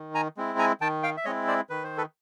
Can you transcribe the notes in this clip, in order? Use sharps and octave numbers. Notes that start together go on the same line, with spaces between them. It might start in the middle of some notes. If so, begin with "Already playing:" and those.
Already playing: D#3
G#5 A#5
G#3 C4 E4
G#5 A#5
D#3 G5 A5
F5 G5
E5
G#3 C4 E4 C#5 D#5
C5 D5
D#3 B4
C5
A4 B4